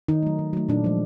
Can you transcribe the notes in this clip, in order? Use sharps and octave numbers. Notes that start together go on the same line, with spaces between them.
D#3 D#4
F#3 A3
D#3
F#3 A3
A#2 D4
F3 G#3